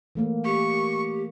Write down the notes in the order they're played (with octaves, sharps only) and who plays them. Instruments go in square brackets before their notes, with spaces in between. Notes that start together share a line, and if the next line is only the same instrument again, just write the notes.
[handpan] E3 A3 A#3
[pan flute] G4 [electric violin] C#6